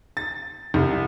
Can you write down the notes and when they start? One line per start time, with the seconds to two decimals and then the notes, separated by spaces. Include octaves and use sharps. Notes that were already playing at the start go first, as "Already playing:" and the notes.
0.17 A6
0.74 C2